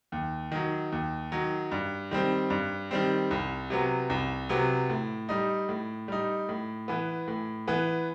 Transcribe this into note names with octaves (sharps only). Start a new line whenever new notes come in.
D#2
D#3 F#3
D#2
D#3 F#3
G2
D#3 G3 C4
G2
D#3 G3 C4
C2
C3 F#3 B3
C2
C3 F#3 B3
A2
G3 D#4
A2
G3 D#4
A2
E3 B3
A2
E3 B3